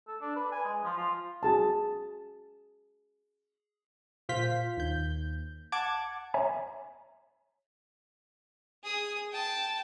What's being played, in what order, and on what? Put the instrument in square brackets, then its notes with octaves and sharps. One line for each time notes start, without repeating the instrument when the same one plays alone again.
[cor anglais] A4
D4
B4
G#5
G#3
F3
F4
[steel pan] F#4 G#4 A5
[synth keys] A#2 F4 C5 F5 G6 B6
D#2 G6
F#5 A5 D6 G#6
[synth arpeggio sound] C#5 E5 G#5 A#5
[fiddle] G#4 D#6
G5 A5